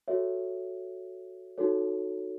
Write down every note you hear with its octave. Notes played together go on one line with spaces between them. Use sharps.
F#4 A4 C#5 E5
D#4 F#4 A4 C#5